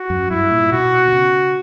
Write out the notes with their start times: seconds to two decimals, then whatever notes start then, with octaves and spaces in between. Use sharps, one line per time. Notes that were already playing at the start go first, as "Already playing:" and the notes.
Already playing: F#4
0.10 F#2
0.30 G2 E4
0.51 A#2
0.72 B2 F#4
1.07 D3
1.13 C#3